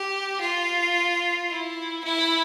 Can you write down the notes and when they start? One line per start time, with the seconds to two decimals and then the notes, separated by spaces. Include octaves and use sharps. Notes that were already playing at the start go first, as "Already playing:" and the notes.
Already playing: G4
0.41 F4
1.50 E4
2.04 E4